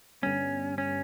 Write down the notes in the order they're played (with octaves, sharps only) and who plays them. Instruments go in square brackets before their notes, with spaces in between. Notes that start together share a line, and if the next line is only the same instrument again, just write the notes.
[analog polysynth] G2 D3 G3 B3 [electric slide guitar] C#4
[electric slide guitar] C#4